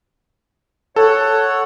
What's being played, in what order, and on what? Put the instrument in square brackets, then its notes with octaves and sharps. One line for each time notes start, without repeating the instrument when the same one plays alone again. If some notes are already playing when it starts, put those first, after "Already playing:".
[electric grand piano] A4 [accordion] C#5 F#5